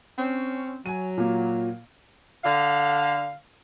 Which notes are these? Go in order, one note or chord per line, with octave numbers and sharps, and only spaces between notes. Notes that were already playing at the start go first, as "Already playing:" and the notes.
C4 C#4
F#3 G#5 D#7
A#2 A#3
D3 F5